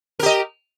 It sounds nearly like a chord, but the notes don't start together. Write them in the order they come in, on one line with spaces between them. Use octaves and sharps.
A#4 G4 D#5